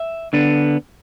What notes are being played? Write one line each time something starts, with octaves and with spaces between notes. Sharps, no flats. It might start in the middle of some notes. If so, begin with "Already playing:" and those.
Already playing: E5
D3 B3 D4